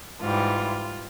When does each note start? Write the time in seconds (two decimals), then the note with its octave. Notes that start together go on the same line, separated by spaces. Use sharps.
0.20 G#2 E3 G3 F4